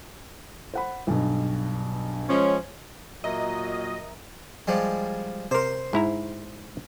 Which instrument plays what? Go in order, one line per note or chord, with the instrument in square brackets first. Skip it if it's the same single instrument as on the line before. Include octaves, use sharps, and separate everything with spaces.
[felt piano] C5 F#5 B5
B1 G2 B2
[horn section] F3 G#3 C#4
[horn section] A#2 F#3 [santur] A#4 E5 [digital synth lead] D#5
[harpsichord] F3 G3 G#3
[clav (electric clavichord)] C3 A#4 [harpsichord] C5 C6
[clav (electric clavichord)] G#2 E4 A#5